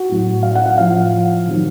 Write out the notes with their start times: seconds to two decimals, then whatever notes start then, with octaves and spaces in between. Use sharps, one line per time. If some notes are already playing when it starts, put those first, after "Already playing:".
Already playing: F#4
0.09 A2 F#3
0.43 F5
0.55 F#5
0.66 F#5
0.78 A2 F3 F5
1.47 C3 D#3 F#3